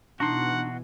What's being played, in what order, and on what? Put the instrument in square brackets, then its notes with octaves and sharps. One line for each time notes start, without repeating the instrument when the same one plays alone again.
[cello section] B2 E3 [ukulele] D4 D#4 [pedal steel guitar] F#4 C6 [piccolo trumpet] F#5